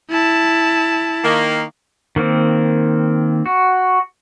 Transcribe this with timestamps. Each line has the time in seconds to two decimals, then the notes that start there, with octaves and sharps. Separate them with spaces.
0.10 E4 A5
1.24 D#3 A#3
2.16 D#3 A#3 C4
3.46 F#4